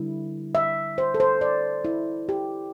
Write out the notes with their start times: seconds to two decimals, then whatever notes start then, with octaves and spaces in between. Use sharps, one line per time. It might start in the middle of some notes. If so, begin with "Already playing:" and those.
Already playing: D3 G3 E4
0.55 E5
0.98 C5
1.14 A4
1.20 C5
1.41 D5
1.85 E4
2.29 G4